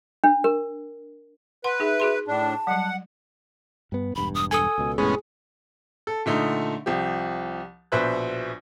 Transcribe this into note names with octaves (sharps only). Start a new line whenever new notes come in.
D4
A#4
B4 F#5 C6
D#4 G#4 E5
F#4 G#4 C6
A2 D4 A5
F#3 G3 F#5
G2 B3
E1 G2 B5
D#6
A4 G#5 D#6
C#2 B2
F1 A2 G#3 B3 C#4 G#4
A4
A#2 D3 A3 D#4
C2 F3 G4
A#1 B2 B4 C5 E5 F#6